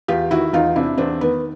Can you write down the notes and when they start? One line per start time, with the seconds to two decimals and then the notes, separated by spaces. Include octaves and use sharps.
0.08 E2 F4 G4
0.31 D#3 E4 F#4
0.53 E2 D#4 F4
0.76 C3 D4 E4
0.98 E2 C4 D4
1.21 D#3 B3